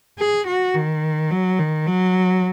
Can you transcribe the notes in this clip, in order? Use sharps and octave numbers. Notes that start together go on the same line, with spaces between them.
G#4
F#4
D#3
F#3
D#3
F#3